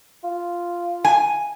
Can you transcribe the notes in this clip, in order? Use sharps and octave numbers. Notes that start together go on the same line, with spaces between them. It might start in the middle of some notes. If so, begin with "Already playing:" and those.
F4
G#5